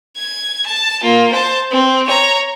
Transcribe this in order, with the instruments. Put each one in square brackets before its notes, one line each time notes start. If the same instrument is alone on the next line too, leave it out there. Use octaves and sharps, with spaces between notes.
[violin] G#6
A5
A#3 F4
C5 A5
C4
C#5 A#5